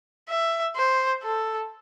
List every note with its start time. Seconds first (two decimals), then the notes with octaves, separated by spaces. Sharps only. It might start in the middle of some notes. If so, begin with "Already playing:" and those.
0.29 E5
0.76 C5
1.23 A4